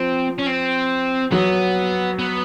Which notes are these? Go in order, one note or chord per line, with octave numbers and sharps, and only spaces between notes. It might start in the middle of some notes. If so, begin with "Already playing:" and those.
Already playing: F3 C4
C#4
C4
F#3 B3
B3